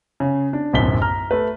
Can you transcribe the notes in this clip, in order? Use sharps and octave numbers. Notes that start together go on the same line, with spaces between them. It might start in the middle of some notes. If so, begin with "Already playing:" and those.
C#3
D4
D1 B1 F#2 B6 G7
A#5 F6
A3 B4